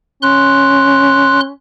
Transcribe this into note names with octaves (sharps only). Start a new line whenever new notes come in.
C#4 C6 F#6